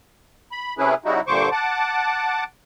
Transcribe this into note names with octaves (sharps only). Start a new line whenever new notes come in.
B5
C3 A3 C#4 E4 G#4 B4
C#3 G3 D#4 E4 F#4
G2 A#2 D3 C5 C#6 D6
F#5 A5 D6